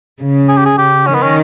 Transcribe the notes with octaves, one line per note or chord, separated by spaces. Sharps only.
C#3
G#4
G4
G#4
G4
D#3 C#4
B3
C#4